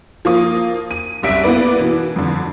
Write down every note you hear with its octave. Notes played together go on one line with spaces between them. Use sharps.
F3 A#3 D#6
D#7
F#1 C2 E5 D7
A#3 B3 E4 B4 D5
B2 E3
F2 D3